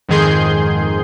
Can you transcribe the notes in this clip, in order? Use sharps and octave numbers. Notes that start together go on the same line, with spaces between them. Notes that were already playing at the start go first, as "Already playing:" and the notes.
F2 G#2 D#3 G#4 C6 G6